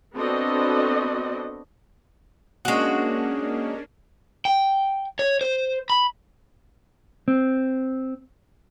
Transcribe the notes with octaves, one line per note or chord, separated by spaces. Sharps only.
B3 C4 D4 F#4 A4 D#5
G#3 A#3 C#4 D4 F#4
G5
C#5
C5
B5
C4